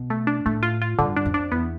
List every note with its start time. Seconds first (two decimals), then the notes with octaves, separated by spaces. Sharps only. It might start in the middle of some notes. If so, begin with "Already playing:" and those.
Already playing: B2
0.10 A3
0.27 D4
0.46 A2 A3
0.63 F4
0.82 F4
0.99 G2 D3
1.16 D4
1.25 F2
1.34 D4
1.52 E2 B3